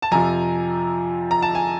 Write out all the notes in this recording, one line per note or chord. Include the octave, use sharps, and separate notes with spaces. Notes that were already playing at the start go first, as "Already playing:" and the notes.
A5
F2 C3 F3 G#5 A#5
A#5
A5
G#5